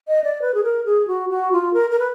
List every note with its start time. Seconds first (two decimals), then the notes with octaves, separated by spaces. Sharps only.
0.08 D#5
0.24 D5
0.42 B4
0.54 G#4
0.64 A#4
0.86 G#4
1.08 F#4
1.30 F#4
1.53 F4
1.74 A#4
1.91 A#4
1.99 B4